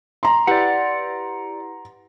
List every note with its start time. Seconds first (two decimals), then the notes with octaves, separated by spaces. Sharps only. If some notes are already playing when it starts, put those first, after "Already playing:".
0.23 A#5 C6
0.47 E4 G4 B4 D5 F#5